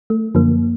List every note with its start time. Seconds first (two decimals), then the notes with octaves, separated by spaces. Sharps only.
0.10 A3
0.35 F#2 D3 F3 A#3